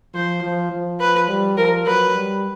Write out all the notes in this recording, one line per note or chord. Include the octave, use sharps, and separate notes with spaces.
F3 C5
F3
F3
B4
G3
F3 A#4
F#3 B4
G3